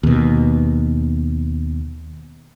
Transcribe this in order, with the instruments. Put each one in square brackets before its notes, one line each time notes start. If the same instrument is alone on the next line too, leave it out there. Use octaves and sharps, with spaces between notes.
[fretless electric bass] D#2 B2